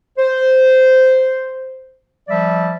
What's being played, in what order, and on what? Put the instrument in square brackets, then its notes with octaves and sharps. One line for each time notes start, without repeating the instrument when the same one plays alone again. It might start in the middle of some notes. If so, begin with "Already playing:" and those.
[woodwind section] C5
F3 G3 D5 E5